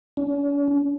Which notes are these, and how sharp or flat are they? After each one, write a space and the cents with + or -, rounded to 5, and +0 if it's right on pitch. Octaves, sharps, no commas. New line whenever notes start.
C#4 +45